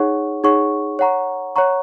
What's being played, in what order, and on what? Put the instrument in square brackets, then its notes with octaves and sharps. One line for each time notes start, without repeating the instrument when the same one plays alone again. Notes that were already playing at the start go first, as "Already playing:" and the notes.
Already playing: [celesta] D#4 G#4 C#5 F#5 C#6
D#4 G#4 C#5 F#5 C#6
C#5 F#5 A#5 C#6
C#5 F#5 A#5 C#6